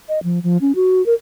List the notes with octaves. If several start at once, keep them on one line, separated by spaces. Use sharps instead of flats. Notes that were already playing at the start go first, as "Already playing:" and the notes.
D#5
F3
F3
C#4
F#4
A#4